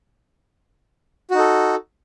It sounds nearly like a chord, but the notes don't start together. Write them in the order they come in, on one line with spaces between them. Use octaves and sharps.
F#4 D#4 A4